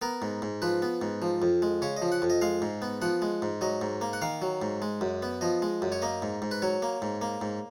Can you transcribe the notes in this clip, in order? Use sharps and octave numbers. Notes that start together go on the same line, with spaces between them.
B3 A#4
G#2
G#2
F3 B4
B3
G#2
F3
F2
G#3
C#3 C#5
D#5
F3
F#5
F2
D#5
G#3 F5
G#2
B3
F3 F#5
G#3
G#2
F#3 D#5
G#2
A#3
F#5
D#3 F5
F#3
G#2
G#3
F#2
B3
F3 D#5
G#3
F#2
C#5
A#3 D#5
G#2
G#2
B4
F#3 C#5
A#3
G#2
A#3
G#2